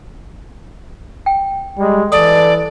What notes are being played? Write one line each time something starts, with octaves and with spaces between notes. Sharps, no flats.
G5
G3 G#3
E3 A4 D5 D#6